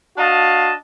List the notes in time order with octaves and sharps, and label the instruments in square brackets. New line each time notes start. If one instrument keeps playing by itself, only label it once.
[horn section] D4 F#4 D#5 F5 A5